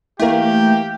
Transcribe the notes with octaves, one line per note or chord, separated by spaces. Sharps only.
E3 A3 A#3 G4